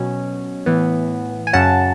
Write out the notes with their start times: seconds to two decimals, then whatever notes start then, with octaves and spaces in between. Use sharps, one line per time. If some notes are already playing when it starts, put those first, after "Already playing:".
Already playing: B2 F#3 C#4
0.66 A2 E3 B3
1.47 G#5
1.53 F#2 C#3 F#3 C#4 F#5 A5